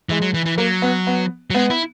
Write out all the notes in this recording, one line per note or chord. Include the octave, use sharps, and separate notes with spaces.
E3 G#3
F#3
E3
E3
F#3 A#3
B3
B3
F#3
G#3 B3
E4